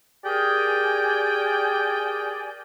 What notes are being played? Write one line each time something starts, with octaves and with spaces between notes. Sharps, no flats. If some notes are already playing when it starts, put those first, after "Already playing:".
G4 G#4 A#4 D5 G5 G#5